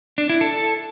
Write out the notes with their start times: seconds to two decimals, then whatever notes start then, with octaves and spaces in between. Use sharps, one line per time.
0.18 D4
0.29 E4
0.41 A4